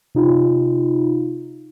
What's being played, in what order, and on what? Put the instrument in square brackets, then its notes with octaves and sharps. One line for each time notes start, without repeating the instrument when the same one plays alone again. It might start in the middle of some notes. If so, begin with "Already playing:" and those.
[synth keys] C3 D#4 F4